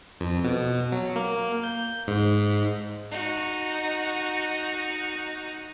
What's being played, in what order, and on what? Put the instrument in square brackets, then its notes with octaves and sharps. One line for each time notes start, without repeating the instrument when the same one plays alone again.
[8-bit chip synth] F2
B2
F#3
A#3
G6
G#2
[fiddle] D#4 F#4